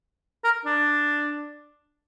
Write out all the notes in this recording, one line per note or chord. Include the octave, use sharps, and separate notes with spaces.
A#4
D4